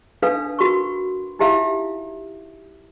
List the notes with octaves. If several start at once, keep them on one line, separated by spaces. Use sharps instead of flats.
D4 D#4 A4 B4 F5
F#4 A#4 B5 C#6
D#4 E4 G4 E5 F5